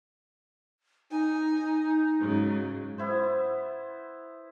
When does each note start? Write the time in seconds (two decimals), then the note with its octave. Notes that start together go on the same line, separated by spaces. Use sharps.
1.11 D#4 G#5
2.20 G#2 C#3 F#3
2.98 B3 E4 C5